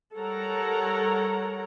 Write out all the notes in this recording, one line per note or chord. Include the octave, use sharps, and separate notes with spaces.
G3 A4 A#4 C#5 F#5 A#5